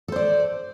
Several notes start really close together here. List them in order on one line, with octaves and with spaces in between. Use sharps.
A4 C5 D5